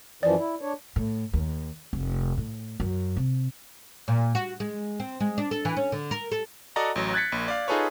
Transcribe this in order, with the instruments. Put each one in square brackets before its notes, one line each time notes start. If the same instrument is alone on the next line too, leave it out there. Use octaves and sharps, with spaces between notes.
[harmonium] F#2 E3 F3 [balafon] D5
[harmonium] E4
D4 C#5
[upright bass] A2
D#2
F1
A2
F#2
C3
[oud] A#2
F#4
G#3
C4
G#3
D4
A4
E3
C#4
D3
A#4
A4
[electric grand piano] F#4 A4 D5 D#5 F#5 A#5
A1 F#3
F#6 G#6 A6 B6 C#7
A#1 A#3
D5 F5
D#4 F4 G#4 A4 B4 C#5